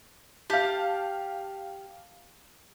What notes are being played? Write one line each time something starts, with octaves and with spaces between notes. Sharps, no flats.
G4 F5 A5